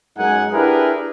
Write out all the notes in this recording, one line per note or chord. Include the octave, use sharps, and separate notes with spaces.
F#2 G#3 D#4 F#5 G#5
D4 E4 G4 G#4 A#4 B4